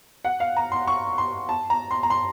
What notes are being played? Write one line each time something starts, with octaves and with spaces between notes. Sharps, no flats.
F#5
F5
A#5
C6
C#6
C6
A5
A#5
C6
A#5
C6